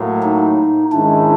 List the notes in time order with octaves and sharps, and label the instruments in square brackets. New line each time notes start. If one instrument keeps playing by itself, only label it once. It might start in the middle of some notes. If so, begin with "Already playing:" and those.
Already playing: [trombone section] A2 F#3 A#3
[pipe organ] D#4
[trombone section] G#2 D#3 G#3 C#4 E4 [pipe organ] D4